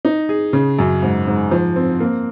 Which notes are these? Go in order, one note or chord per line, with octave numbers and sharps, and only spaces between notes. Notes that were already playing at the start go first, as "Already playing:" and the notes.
D#4
G#4
C#3
F#2
G#2
G#2
F3
C4
A#3